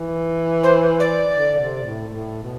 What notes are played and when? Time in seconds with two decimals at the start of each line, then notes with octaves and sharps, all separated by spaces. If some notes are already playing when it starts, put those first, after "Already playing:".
Already playing: E3
0.63 C5
1.00 D5
1.35 D3
1.59 C3
1.83 A2
2.07 A2
2.43 B2